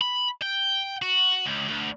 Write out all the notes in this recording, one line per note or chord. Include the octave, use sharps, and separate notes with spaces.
B5
G5
F#4
C#2
D2